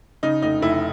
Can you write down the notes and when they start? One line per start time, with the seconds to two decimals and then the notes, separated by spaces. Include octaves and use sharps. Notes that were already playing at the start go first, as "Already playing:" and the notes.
0.23 C#3 D#4
0.42 F1 D#4
0.62 F1 E4